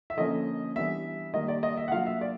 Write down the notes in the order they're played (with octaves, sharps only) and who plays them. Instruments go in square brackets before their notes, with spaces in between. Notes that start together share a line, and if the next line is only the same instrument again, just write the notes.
[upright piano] E5
D3 F3 A#3 C#4 D#5
E3 G3 B3 D4 E5
D#3 G3 A#3 D#5
D5
D#5
E5
F#5
F#3 A#3 D4 F4 F5
E5
D5